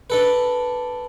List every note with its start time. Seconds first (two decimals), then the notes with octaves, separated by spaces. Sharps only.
0.10 D4 A4 B4